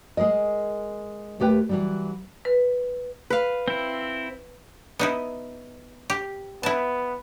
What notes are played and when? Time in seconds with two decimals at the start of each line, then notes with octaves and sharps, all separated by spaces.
0.17 G#3 G#4 A#4 D#5
1.40 D#2 A3 G4 B4 G5
1.69 E3 F#3 G3
2.45 B4
3.30 B4 F5
3.68 C4 E4
4.99 B3 D#4 E4
6.10 G4
6.63 B3 E4 A5